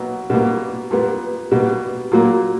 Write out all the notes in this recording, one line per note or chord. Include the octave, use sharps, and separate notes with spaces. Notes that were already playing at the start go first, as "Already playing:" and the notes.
Already playing: B2 F#3 A#3
B2 G3 A#3
A#2 G3 B3
B2 G3 A#3
A#2 F#3 A#3